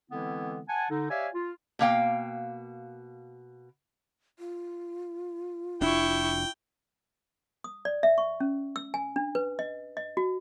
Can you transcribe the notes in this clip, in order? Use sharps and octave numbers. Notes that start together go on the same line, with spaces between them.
D3 E3 G#3 B3 C4 E4
F#5 G#5 A5
D3 D#4
G4 C#5 D5 E5 F5 G#5
F4
B2 A#3 F5 G5
F4
F1 D4 E4 G5 C#6
D#6
D5
E5
C#6
C#4
E6
G#5
D4
B4
D#5
D#5
F#4